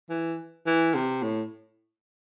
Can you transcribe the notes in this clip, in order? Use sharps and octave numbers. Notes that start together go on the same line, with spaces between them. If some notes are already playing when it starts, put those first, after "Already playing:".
E3
E3
C3
A2